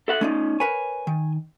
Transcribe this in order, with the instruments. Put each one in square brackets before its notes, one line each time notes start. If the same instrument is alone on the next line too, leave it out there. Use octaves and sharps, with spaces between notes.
[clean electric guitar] A4 E5 F#5
[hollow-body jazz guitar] A3 F4 D5 [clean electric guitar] C#4 D#4
[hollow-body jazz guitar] A#4 B4 C#5 [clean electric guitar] G#5
[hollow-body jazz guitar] D#3